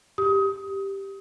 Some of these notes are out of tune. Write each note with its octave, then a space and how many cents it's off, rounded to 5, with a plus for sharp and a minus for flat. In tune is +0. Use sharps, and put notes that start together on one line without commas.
G4 +0 D#6 +25